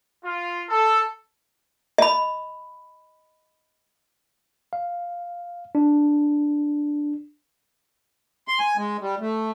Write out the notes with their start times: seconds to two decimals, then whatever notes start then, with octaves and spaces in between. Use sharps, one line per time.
0.24 F4
0.68 A4
1.98 D#5 B5
4.73 F5
5.75 D4
8.48 C6
8.59 G#5
8.77 G#3
9.01 G3
9.20 A3